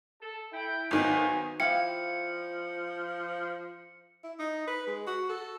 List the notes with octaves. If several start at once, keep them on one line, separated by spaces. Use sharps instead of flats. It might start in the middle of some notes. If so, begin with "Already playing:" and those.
A4
E4 G5
G#1 D#3 F#3 B3 G#5
F3 E4 D5 F5 G5 C#7
E4
D#4
B4
G#3
F#4
A4